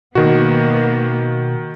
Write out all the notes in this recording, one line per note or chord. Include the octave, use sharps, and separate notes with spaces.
B2 D#3 A#3 B3 F#4